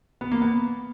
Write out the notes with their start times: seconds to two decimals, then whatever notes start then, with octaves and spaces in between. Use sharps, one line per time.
0.21 B3
0.32 A#3
0.42 B3